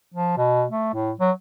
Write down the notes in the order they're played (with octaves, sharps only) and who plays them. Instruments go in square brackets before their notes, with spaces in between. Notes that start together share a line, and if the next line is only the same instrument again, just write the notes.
[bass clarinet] F3
B2
A3
A2
F#3